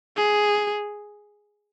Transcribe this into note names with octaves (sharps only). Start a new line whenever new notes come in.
G#4